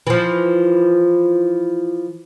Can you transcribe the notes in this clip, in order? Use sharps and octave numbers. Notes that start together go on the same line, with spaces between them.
E3 F3